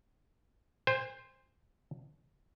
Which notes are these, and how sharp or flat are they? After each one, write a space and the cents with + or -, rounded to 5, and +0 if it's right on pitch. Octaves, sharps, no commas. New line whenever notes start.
C5 +0 G#5 -45